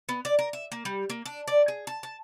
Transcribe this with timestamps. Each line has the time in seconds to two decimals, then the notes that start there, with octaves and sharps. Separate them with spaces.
0.09 B3
0.25 D5
0.39 A#4
0.53 E5
0.72 A#3
0.85 G3
1.10 A#3
1.26 D4
1.48 D5
1.68 G#4
1.87 A5
2.03 A5